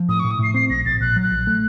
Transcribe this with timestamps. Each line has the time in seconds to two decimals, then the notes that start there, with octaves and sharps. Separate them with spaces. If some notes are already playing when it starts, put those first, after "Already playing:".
Already playing: F3
0.09 A2 D#6
0.20 C#6
0.24 A2
0.31 D#6
0.39 A2 C7
0.54 C4 C7
0.70 A#1 A#6
0.86 A#1 A6
1.00 A#1 F#6
1.16 F#3
1.23 F#6
1.31 A#1
1.47 A3